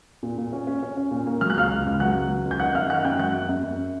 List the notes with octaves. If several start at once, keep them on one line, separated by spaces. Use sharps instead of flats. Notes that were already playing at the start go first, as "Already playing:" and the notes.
A#2
A#2
C#4
C#4
C#4
C#4
A#2
A#3
F#3 F6
F#6
C#2 F5 F6
C#2
C#2
F#3 F#5 F#6
C#2
F#3
C#2
G6
D#3 F#5 F#6
F#2 F5 F6
D#3 F#5 F#6
F#2 G5 G6
F#3 F#5 F#6
F#2
F#2
F#2